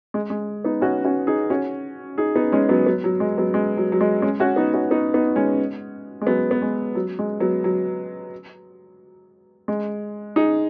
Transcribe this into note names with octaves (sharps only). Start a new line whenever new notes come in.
G#3
G#3
B3 D#4
C#4 F#4
C#4 F#4
D#4 G#4
C#4 F#4
D#4 G#4
B3 D#4
G#3 C#4
F#3 B3
F#3 B3
F#3
G#3
F#3 B3
G#3
F#3
F#3
G#3
G#3 C#4
C#4 F#4
B3 D#4
C#4 F#4
B3 D#4
B3 D#4
G#3 C#4
G#3
F#3 B3
B3
G#3
F#3
G#3
F#3 B3
F#3
G#3
D#4 G#4